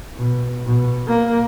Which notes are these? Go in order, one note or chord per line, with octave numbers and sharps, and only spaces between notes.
B2
B2
A#3